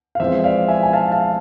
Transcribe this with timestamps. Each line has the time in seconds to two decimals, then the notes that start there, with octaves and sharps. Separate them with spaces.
0.15 F5
0.20 F2 E3 G#3 C4 C5 E5
0.44 D5 F5
0.68 E5 G#5
0.83 G#5
0.93 F5 A5
1.11 F5 A5